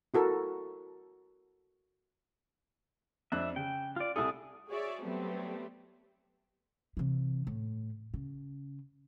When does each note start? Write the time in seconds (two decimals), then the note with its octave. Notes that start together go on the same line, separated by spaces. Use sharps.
0.14 E4 F#4 A4 A#4
3.32 F2 D4 E5 F#6
3.56 C#3 G5
3.96 F4 D5
4.16 C2 E4 G#4 A4 D#6
4.68 F#4 G#4 C#5 D5 E5
5.02 F#3 G3 A3 B3 C4 G4
6.97 C3 E3
7.47 A2
8.14 C#3